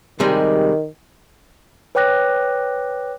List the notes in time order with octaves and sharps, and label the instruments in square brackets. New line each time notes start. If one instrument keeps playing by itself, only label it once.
[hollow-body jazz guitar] C3 G3 G#3 [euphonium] D#3
[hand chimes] B4 C#5 G5 D6 F#6 A#6